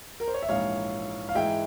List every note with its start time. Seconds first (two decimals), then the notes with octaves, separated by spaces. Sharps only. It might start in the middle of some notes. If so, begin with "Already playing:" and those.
0.20 A#4
0.28 C5
0.34 C#5
0.43 E5
0.49 A#1 G#2 E3 C#5 F5
1.29 F5
1.35 G#2 E3 G#3 E5 G5